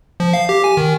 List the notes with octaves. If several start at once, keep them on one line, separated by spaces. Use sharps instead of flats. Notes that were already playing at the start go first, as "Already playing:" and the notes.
F3
F5
G4
G#5
D#3